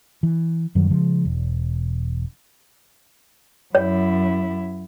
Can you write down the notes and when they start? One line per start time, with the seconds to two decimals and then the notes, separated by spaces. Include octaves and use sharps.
0.23 E3
0.75 F#2 D#3 F#3 G3
0.90 C#3 F3 G#3
1.25 E1
3.75 F#2 E4 C#5